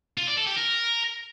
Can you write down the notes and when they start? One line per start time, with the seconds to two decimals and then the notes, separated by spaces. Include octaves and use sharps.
0.18 F4
0.27 D5
0.37 A4
0.47 G4
0.56 A#4